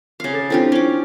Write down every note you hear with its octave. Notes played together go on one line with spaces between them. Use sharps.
C#3 F5
A4 A6
C4 D4 E4 F4 G4
C#4 D6